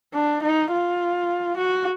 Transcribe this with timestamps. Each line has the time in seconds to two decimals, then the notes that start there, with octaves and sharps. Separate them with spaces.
0.14 D4
0.42 D#4
0.72 F4
1.57 F#4